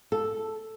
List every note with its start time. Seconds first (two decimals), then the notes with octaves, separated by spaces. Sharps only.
0.12 A4